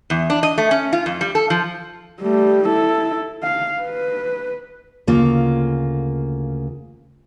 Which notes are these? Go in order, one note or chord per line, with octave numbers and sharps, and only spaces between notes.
E2
D4
D#5
A3
C#4
F4
F2
G3
A4
F3
G3 A3
E4 A4
F5
B4
D2 C#3 A#3 F4